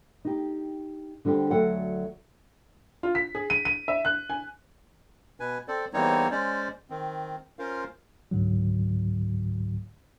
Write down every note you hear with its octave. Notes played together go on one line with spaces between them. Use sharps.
D#4 G4
D3 G3 C4 G4
D2 F#3 A4 D5 F#5 G5
F4
B6
G#4
D#7
D#7
E5
F#6
G#5
B2 B4 G#5
C4 A4 C5 D5
E2 G3 A#3 C4 D#4 C#5
G#3 C#4 C5 D5
D#3 C4
C#4 F4 A#4 C5 F5
C#2 G#2 D3 F#3